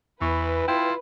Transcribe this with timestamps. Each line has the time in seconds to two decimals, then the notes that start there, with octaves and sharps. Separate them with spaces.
0.21 E2 E3 B4 C#6
0.68 E4 F4 G5